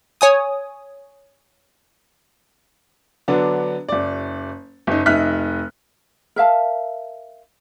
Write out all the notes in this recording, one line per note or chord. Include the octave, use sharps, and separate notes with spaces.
C#5 G#5 D#6
D3 F#3 B3 D4
F#1 D5
F#1 D#4
F1 D#4 E5 F6 F#6 B6
A#4 E5 F5 A5